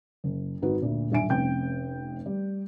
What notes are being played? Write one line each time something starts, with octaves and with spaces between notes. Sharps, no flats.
F#1
G#1 D#4 F#4 B4
D2 A#2
D#1 B1 D4 E5 G#5 D7
F1 C4 C#4 G5 G6
G3